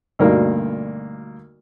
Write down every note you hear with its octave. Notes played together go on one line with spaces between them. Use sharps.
D2 G2 B2 A#3 D#4 A#4